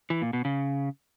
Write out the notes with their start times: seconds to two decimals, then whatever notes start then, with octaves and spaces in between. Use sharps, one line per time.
0.10 E3
0.22 A#2
0.33 B2
0.45 C#3